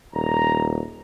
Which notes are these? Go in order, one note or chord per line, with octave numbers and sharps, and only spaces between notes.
D#1 A#5